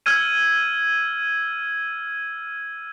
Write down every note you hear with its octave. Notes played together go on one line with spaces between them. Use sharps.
E6 F6 G#6 D#7